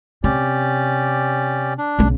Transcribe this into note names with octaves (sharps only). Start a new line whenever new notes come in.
C3 C#4 G4 D5
D4
B1 C#3